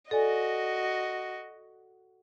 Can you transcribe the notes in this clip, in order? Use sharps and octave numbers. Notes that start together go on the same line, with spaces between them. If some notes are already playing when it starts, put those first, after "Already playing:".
F#4 A4 D5 D#5 G#5